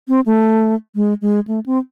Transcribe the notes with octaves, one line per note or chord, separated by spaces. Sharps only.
C4
A3
G#3
G#3
A3
C4